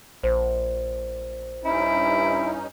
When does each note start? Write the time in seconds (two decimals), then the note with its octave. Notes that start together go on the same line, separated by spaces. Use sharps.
0.23 A#1 C5
1.64 G2 C#4 D#4 E4